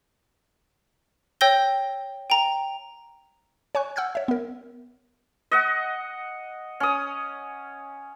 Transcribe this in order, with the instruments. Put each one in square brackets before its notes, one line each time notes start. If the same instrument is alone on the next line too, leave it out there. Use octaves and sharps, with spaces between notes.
[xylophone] C#5 G5 E6 G6 A#6 G7
G5 A#5
[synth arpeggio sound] C#5 G#5 C#6 F#6
F#5 E6 F6 G6 G#6
C#5 E5
B3 A#4
[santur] D#5 F#5
C#4 D#6